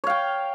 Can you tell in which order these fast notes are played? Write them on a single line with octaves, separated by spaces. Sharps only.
C#5 F5 G5